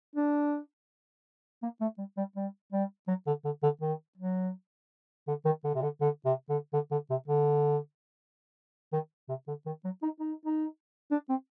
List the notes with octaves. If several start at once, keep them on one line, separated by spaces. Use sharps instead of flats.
D4
A#3
A3
G3
G3
G3
G3
F#3
D3
D3
D3
D#3
F#3
D3
D#3
D3
C3
D3
D3
C3
D3
D3
D3
C3
D3
D#3
C3
D3
D#3
F#3
D#4
D#4
D#4
D4
C4